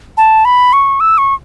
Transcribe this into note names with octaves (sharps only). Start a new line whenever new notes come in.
A5
B5
C#6
E6
C#6